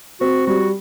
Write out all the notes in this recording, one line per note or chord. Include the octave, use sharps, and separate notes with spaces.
C4 F#4
G3 F#4